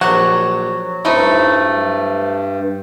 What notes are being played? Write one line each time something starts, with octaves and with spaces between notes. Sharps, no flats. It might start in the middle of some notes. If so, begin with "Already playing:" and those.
A#1 F#3 G4 F#5 A5
G2 A3 C4 D#4 E4